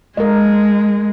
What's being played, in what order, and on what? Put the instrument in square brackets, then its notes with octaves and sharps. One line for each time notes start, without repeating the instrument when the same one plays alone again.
[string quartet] G#3 [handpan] A#4 D#5